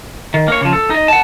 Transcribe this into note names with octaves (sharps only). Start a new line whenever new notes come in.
D#3
A#3 C#5
C#3 F3
A4
D#4 D#5
F#5 A5